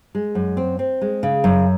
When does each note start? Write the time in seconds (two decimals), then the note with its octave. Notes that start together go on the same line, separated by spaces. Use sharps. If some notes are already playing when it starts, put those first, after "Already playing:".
0.15 G#3
0.35 F#2
0.57 C4
0.79 C4
1.01 G#3
1.23 C#3
1.44 F#2